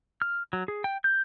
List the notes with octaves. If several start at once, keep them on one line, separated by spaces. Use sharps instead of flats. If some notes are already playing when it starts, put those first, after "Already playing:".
F6
F#3
G#4
G5
G6